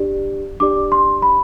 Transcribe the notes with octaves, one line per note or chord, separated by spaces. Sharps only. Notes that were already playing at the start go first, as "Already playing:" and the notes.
Already playing: D4 G4 D5
D4 G4 D5 D6
C6
B5